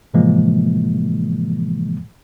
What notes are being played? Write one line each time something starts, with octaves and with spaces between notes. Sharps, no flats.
A2 C3 E3 F3 G#3 A#3